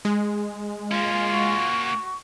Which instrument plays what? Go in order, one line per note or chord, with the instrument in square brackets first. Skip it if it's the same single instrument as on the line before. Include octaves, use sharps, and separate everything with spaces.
[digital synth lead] G#3
[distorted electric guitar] A#3 C#4 [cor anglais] F4
[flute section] F#4 C#6